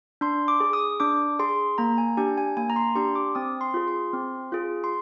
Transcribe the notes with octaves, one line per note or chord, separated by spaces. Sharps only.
D4 C6
D6
G#4
D#6
D4 D6
G#4 C6
A#3 A#5
G#5
D4 G4 G#5
G#5
A#3 G#5
A#5
C6
D4 G4 C6
D6
C4 D#6
C6
F4 G#4
C6
C4
F4 G#4
C6